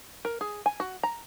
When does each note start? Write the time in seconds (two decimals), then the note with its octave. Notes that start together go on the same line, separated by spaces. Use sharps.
0.25 A#4
0.41 G#4
0.66 G#5
0.80 F#4
1.03 A#5